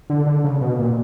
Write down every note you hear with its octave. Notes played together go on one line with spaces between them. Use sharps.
D3
D3
C#3
B2
A#2